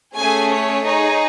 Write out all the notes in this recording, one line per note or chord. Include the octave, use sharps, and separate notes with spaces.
A3 C#4 G#4 G#5
C#5
D#4 G#4 C#5